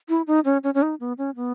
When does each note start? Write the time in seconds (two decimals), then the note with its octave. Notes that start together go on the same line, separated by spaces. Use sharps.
0.09 E4
0.27 D#4
0.45 C#4
0.64 C#4
0.74 C#4
0.82 D#4
1.00 B3
1.18 C#4
1.36 B3